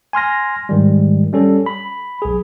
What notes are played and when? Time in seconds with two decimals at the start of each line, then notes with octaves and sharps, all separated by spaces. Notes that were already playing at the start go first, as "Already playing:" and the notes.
0.13 G#5 C6 F6 A#6
0.69 G#2 D#3 G3
1.33 G3 C#4 A4
1.66 B5
2.22 B1 G#4